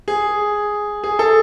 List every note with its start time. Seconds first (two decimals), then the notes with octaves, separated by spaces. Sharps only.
0.08 G#4
1.04 G#4
1.19 A4